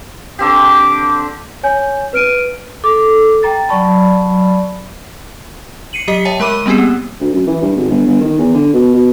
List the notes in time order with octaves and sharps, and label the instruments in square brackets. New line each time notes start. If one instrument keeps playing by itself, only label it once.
[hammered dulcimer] D3 C4 G4 [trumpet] D6
[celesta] C#5 G#5 G6
B4 F6 D7 D#7
[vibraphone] A4 [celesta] D6
[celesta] G5 A#5 A6
[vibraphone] F#3 D5 B5 [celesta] A5 C#6
[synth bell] C7 C#7 D#7 F#7
F#3 G4 D#5 B6 C#7
C#5 E5 G5 A5
G#3 A#4 B5 D6 D#7
G3 B3 C4 G4 G#4
A#3
[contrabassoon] D2
F#2
E3
G2
G#1
G1
G1
D#3
E2
D3
B2
B2